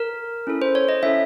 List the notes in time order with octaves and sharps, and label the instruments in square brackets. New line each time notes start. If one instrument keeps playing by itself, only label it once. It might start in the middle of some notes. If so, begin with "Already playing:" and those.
Already playing: [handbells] A#4
C#4 E4 A4
C5
C#5
D#5
C#4 E4 A4 E5